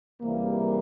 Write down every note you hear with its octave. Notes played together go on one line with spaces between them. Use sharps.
C#2 C3 E3 G3 A#3